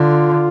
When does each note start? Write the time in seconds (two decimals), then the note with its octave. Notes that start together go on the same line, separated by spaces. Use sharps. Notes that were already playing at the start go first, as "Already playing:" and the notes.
Already playing: D3 F4